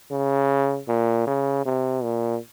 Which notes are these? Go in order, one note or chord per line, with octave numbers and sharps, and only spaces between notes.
C#3
A#2
C#3
C3
A#2